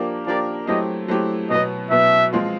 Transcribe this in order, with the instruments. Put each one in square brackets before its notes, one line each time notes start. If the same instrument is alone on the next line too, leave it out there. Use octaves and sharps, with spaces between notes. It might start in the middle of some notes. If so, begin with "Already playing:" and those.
Already playing: [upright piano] F3 A#3 D4 G4 A#4
[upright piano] F3 A#3 D4 G4 A#4 [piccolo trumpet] D5
[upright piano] F#3 A3 C4 E4 G4 [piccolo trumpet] D#5
[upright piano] F#3 A3 C4 E4 G4
[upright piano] B2 F#3 B3 [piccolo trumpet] D#5
[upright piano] B2 F#3 B3 [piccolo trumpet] E5
[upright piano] F3 G#3 C4 F4